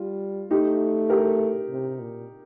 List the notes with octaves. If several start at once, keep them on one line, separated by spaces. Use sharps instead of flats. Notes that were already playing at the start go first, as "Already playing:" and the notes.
Already playing: G3 F4
A3 D#4 G4
G4 A#4
C3
A#2